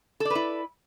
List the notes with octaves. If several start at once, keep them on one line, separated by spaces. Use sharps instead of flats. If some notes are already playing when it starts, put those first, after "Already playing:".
E4 A4 B4 D5